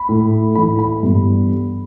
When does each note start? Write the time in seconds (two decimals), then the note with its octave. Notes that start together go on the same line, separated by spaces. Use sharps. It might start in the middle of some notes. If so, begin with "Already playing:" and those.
Already playing: B5
0.09 A2 A3
0.55 A2 E3 A3 B5
0.79 B5
1.03 G2 G3 B3